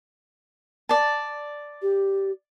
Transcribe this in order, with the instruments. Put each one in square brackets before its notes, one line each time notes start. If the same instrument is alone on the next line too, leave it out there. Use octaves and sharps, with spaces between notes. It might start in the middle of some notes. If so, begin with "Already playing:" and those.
[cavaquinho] D5 A5
[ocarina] G4